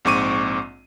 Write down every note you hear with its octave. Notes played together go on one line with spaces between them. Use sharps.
A#1 G#2 C4 C#6 D6 D#7